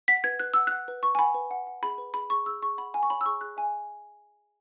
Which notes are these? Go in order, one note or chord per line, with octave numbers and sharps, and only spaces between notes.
F#5 B6
B4 G#6
B4 F#6
F#5 E6
F#5 F#6
B4
B4 C#6
G#5
F#5 B5
B4
F#5
F#5
G#4 B5
B4
G#4 B5
G#4 C#6
G#4 E6
G#4 C#6
F#5 B5
F#5 G#5
C#6
C#5 B5
E6
G#4 C#6
G#4 F#6
E5 G#5